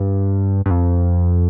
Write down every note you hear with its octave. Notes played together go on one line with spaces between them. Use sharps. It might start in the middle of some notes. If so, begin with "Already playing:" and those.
Already playing: G2
G2
F2